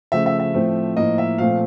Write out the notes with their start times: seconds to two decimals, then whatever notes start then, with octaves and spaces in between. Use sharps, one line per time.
0.12 C#3 F3 A3 E5
0.26 E5
0.40 E5
0.54 A2 F3 A3 C4
0.97 A2 F3 A#3 D#5
1.18 E5
1.38 A#2 F3 A3 C4 F5